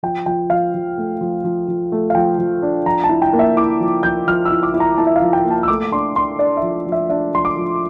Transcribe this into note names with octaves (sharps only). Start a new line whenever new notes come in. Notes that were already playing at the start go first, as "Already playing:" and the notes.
F3 G5
F3 G5
F3 F5
F3
A3
F3
F3
F3
A3
F5
F3 G5
F3
D4
F3 A#5
A5
E4
G5
A#3
E5
E4 D6
F3
F3 G6
F3 F6
E6
E4
D6
E4
A#5
E4 A5
E5
F5
F3
G5
A#3
A5
E6
A3 D6
D4 C6
D4 C6
D4 D5
E5
F3
F3
E5
D4 E5
F3 C6
D6
F3